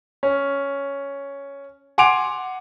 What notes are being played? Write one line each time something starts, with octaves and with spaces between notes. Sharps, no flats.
C#4
F#5 G#5 C6 D6 D7 F7